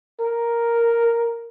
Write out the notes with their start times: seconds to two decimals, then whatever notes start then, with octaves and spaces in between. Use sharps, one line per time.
0.20 A#4